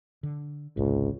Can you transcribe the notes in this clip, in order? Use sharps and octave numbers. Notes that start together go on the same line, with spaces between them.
D3
G#1 C#2 G#2 C3